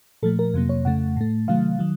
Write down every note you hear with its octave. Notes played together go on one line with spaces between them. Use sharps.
A#2 F3 A3 A4
A#4
F2 C3 F#3 A#3
C#5
F2 C#3 A3 F#5
A2 A3
C3 D#3 F#3 A3 F5
D#3 F#3